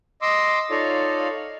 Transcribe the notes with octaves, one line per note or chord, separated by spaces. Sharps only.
D#5 C6 D6 E6
D#4 F4 A4 C#5 D5 F5